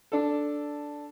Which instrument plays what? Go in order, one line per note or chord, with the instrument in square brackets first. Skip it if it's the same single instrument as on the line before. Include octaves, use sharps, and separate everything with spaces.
[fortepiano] D4 A4